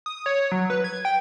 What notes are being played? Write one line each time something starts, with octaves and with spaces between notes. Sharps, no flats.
D#6
C#5
F#3
B4
G#6
G5